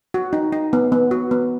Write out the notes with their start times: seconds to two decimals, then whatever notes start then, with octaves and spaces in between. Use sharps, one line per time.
0.14 F#4
0.33 D#4
0.52 D#4
0.73 B3
0.92 B3
1.11 F#4
1.31 B3